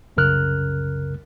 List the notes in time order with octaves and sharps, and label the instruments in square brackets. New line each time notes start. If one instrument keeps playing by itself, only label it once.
[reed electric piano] C2 F#2 C#3 A#4 F6 F#6